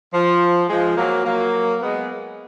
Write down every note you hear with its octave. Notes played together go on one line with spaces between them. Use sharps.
F3
F3 G#3
F#3 A#3
F#3 A#3
G#3 B3